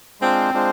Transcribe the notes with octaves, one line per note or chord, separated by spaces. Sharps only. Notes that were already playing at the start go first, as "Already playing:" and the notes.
G#3 C4 D4 F4 C5
G#3 D4 F4 C5